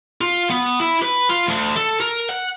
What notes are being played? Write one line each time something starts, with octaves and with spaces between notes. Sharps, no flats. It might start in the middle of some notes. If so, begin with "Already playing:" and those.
F4
B3
E4
B4
F4
D2
A4
A#4
F#5